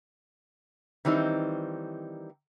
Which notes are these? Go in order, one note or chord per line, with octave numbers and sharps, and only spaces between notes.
D#3 E3 G3 C4 D#4